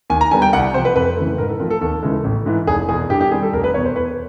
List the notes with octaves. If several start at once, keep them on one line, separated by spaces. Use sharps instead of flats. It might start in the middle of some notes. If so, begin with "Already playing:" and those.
D#2 G#5
A#5
D3 G3 B3 G#5
G5
C2 F#5
C3 F3 C5
B4
F2 B4
C#3 E3 A3
G#2 A#4
A4
F3 A3 C4 F4 A#4
A4
D#2 A4
C#3 E3 G#3
A1
G#2 E3
F1 G#4
E2 B2 G#4
G2 G4
G4
D#3 G3 C4 G#4
A4
F1 A#4
B4
E2 B2 C#5
C5
E2 B4